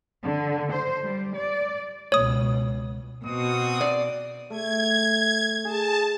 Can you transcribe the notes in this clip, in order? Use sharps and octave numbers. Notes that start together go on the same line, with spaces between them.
D3
C5
G3
D5
C#2 B2 C#5 D#6
B2 C4 F#4 D#6
D5
A3 G#6
G#4 A5